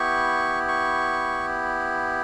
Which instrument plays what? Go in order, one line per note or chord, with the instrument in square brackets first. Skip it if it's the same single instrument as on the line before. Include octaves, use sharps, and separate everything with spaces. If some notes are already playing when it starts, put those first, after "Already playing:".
Already playing: [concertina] B3 E4 G4 C#6
C#6